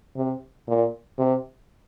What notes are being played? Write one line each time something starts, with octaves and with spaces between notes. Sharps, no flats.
C3
A#2
C3